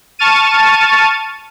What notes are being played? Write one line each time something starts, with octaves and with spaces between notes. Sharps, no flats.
A5 C#6 F6 A6 D#7